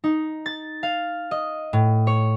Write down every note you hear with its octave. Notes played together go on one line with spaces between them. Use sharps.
D#4
A6
F5
D#5
A2
C#5